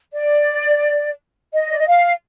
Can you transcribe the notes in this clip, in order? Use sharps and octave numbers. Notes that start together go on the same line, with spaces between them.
D5
D#5
D5
D#5
F5